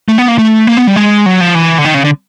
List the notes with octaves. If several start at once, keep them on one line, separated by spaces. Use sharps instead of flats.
A3
B3
A#3
A3
A#3
B3
G3
G#3
F#3
F3
E3
D3
D#3
C#3
D3